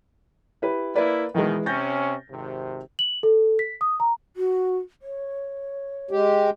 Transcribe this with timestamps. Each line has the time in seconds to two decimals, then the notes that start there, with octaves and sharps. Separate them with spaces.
0.62 E4 G4 B4
0.96 A#3 E4 B4 D5
1.35 B2 D#3 E3 G#3
1.66 C3 C#4 G6 A6 A#6
2.30 G#1 C3
2.99 F#7
3.23 A4
3.59 B6
3.81 D#6
4.00 A#5
4.36 F#4
5.02 C#5
6.11 G#3 G4